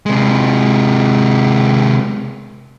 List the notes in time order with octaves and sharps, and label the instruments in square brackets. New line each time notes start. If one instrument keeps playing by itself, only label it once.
[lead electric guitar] C3 G#3